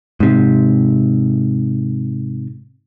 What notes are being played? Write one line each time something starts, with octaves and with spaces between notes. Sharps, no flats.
G#2 C3